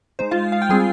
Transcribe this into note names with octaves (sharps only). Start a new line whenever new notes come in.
G#3 D#4 C5
F4 F5
F5
G5
G3 C4 F4 G#4 G#5